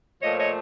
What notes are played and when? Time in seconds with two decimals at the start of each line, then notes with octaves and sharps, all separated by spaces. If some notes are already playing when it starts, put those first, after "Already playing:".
0.22 A#2 F3 A3 C#5 D#5
0.38 C#5 D#5